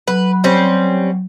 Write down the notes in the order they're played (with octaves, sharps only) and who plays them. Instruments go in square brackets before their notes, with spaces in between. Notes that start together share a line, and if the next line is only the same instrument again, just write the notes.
[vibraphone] F#3 [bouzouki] B4
[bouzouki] G3 C4 C#4